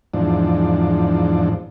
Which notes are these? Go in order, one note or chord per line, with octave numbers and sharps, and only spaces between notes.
E2 G#2 F3 D4